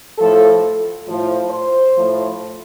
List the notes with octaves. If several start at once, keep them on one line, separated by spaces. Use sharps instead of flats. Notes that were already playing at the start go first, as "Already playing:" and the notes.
A2 F3 A4
A2 F3
C5
A2 F3